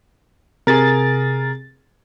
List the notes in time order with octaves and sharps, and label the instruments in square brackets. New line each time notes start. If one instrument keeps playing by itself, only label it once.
[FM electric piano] C3 A6 [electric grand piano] G#4 A#4